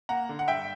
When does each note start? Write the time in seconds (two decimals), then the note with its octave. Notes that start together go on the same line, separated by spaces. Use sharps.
0.09 A#3 F#5 A#5
0.29 D3
0.39 F#5
0.48 G2 E5 G5